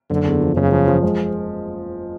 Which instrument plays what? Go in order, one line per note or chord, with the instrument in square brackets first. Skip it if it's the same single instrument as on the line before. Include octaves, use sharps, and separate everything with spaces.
[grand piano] F#1 [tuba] D3
[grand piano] E2
F3
[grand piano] F#1 [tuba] C#3
[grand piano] F3
F3
G#3